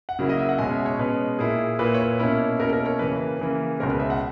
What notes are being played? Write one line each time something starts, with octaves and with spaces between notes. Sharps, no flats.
F#5
C#3 F#3 A#3 E4
D#5
E5
F#5
B2 G#3 C#4 G#5
E5
C#5
B2 G#3 C#4 B4
A#2 A#3 E4 G#4
A#2 A#3 E4 B4
C#5
B4
B2 A#3 C#4 E4 C#5
B2 A#3 C#4 E4 A#4
A#4
C#5
C#3 E3 A#3 B4
C#5
B4
C#3 E3 A#3
C#2 B2 G#3 C#4 A#4
B4
E5
F#5